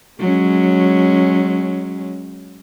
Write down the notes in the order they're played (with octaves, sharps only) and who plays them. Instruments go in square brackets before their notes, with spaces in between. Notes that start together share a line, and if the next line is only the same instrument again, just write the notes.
[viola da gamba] F#3 G#3 C#4